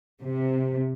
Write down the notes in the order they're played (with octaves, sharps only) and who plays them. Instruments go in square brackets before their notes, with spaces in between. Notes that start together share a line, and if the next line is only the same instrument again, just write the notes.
[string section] C3